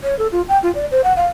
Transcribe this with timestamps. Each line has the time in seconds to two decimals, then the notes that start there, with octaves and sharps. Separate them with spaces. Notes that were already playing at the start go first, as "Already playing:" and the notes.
0.03 C#5
0.19 A4
0.32 F4
0.49 G5
0.63 F4
0.75 D5
0.91 C5
1.04 F#5
1.16 F5